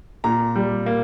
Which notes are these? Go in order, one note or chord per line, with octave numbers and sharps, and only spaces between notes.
A#2 A#5
G3
A#3